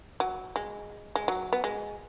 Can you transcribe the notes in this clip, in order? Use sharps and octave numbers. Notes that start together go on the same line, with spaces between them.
F#3
G#3
G#3
F#3
B3
G#3